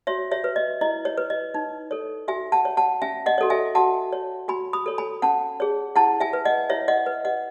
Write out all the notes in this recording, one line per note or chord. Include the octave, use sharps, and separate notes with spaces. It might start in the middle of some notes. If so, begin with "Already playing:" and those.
F#4 C#5 E5
C#5 E5
B4
D#5
E4 D#5
C#5
B4
D#5
D#4
A4 C#5
F#4 E5 G#5
F#5 A5
C#5
F#5 A5
C#4 E5 G#5
D#5 F#5
F#4 A4 C#5
E5 G#5
F#4 F#5 A5
C#5
F#4 G#5 B5
B5 D#6
A4 C#5
G#5 B5
C#4 F#5 A5
G#4 C#5
E4 F#5 A5
E5 G#5
B4
D#5 F#5
E4 C#5 E5
D#5 F#5
B4
D#5 F#5